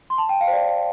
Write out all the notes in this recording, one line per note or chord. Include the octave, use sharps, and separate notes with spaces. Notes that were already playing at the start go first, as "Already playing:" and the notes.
C6
A5
G5
F5
C5
D5